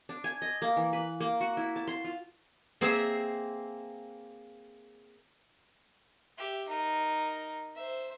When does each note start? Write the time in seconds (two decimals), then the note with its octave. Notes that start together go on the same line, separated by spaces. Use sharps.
0.09 D4
0.24 G#5
0.42 D#5
0.62 A#3
0.77 E3
0.93 B4
1.20 A#3
1.41 F#4
1.57 E4
1.76 A5
1.88 C6
2.05 F4
2.81 A#3 C4 G#4 C5 E5
6.37 G4 E5
6.68 D#4 A#4
7.75 C5 E5